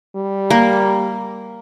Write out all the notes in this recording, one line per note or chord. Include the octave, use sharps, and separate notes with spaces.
G3
A#3